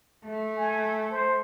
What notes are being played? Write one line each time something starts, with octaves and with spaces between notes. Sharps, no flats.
A3
G#5
C5